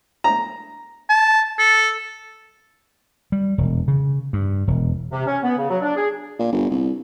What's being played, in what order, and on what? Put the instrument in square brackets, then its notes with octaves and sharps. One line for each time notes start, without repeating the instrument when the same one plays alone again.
[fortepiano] A#5
[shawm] A5
A4
[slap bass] G3
E1
C#3
G2
E1
[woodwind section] C3
C#4
B3
C#3
F#3
D4
G#4
[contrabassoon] A#2
G1
C2